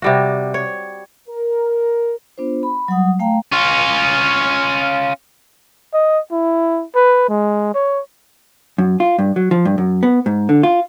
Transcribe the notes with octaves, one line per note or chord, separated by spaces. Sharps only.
C3 G3 F#4
C#5
A#4
B3 D4 F4 C5
B5
F#3 G3 F#5 D#6
A3 F5 G5 A#5
C#4 F4
D#5
E4
B4
G#3
C#5
F#2
F4
G2
F#3
F3
G2
F#2
B3
G#2
D3
F4